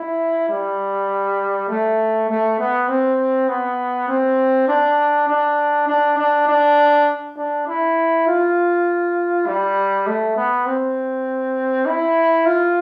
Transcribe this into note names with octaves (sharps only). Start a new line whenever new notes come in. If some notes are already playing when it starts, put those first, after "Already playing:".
Already playing: E4
G3
A3
A3
B3
C4
B3
C4
D4
D4
D4
D4
D4
D4
E4
F4
G3
A3
B3
C4
E4
F4